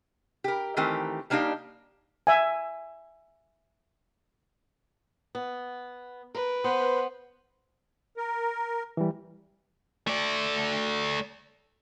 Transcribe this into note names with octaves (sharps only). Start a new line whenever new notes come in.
G4 A#4
D#3 E3 A3 C4 G4 A#4
G3 A#3 D4 D#4 G4 F5
E5 G#5
B3
A#4 B4
B3 C5
A#4
E3 G3
A3 D5